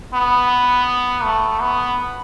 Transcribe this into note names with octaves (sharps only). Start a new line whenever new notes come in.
B3
A3
B3